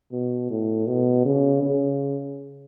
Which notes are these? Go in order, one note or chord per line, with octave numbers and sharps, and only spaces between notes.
B2
A2
B2
C#3
C#3